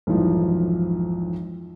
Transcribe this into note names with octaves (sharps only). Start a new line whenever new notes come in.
B1 F2 G#2 E3 F3